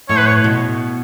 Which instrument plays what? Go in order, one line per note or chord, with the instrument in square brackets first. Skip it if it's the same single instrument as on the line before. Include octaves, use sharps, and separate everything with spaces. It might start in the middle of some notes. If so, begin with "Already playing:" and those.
[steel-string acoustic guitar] A2 [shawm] C#5
[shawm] B4
C#5
[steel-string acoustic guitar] B2